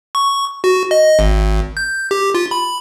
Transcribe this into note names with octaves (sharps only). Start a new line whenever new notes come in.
C#6
F#4
D#5
G#1
G6
G4
F4
B5